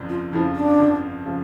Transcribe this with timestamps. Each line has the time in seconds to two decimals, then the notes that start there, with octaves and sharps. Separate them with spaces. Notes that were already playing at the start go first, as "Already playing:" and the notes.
Already playing: G1 F2 C#3 F3
0.09 F4
0.32 F2 C#3 F3 E4
0.55 D4
0.79 G1
1.25 C#3 F3